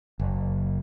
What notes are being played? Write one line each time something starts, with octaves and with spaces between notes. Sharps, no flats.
F#1